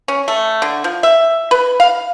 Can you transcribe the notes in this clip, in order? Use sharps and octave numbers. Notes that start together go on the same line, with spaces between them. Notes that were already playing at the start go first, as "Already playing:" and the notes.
C#4
A3
D3
F3
E5
B4
F5